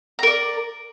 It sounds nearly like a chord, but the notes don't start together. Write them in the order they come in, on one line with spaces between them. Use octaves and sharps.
A#5 A#4 D5